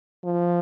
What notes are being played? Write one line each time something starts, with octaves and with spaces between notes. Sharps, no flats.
F3